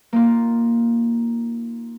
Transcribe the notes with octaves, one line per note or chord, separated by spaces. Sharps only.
A#3 D#4 F4